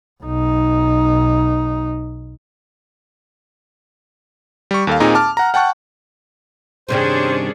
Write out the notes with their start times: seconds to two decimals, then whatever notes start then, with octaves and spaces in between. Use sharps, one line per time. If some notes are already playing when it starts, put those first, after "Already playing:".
0.23 B1 D#4
4.71 G3 C#6
4.87 D#2 A4 F5
5.00 A#2 C4 D#4 G#4 A#5
5.15 A5 D6 F6
5.37 F#5 A#5
5.54 F#5 G5 A5 C#6 F#6
6.89 G2 C3 D#3 C#4 D4 G#4 C5